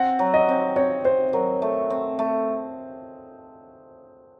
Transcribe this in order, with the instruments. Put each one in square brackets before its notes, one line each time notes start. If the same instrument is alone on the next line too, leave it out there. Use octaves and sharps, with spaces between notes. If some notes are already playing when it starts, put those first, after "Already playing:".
Already playing: [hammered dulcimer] C4 [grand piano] F#5
[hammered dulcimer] F#3
[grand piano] D#5
[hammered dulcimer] C4
[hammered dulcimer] C4 [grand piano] C#5
[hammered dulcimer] C4 [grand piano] C5
[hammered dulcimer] F#3 [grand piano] A#4
[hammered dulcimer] A3
C4
A3